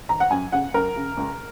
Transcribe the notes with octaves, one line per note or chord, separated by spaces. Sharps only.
D#3 A#5
F#5
F#2 G#5
C#3 F#5
F#2 A#4
C#3
C#2